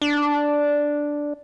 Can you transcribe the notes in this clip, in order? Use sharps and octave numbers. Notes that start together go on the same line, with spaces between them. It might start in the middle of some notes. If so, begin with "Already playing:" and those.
D4